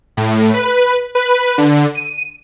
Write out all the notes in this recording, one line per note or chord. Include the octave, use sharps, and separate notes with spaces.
A2
B4
B4
D3
D#7